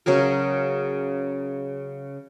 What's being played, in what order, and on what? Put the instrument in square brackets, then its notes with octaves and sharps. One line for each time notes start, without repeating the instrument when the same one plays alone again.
[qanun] C#3 F#3 G#4 A#4